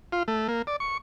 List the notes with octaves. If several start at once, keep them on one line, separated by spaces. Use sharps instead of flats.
F4
A3
A#3
D5
C#6